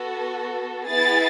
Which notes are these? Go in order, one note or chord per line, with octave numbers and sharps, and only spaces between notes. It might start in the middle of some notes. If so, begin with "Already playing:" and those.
Already playing: B3 F#4 A4
B3 E4 G#4 A6